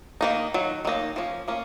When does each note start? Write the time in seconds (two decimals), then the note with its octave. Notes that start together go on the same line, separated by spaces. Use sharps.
0.21 D#3 F#3 A#3 D#4
0.54 D#3 F#3
0.85 D#3 F#3 A#3 D#4
1.16 F3 A#3 C#4
1.48 F3 A#3 C#4